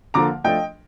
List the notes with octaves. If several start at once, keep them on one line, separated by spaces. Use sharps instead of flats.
D3 F3 A#3 A#5 D6
F3 A3 D4 D#5 G5